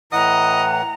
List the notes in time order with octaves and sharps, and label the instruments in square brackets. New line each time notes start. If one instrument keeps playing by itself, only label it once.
[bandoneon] A2 E3 F#5 [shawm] D#5 [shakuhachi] A#5